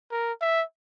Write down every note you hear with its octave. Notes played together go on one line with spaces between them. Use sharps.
A#4
E5